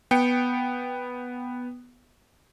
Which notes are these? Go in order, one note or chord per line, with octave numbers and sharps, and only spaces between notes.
B3 G5 C#7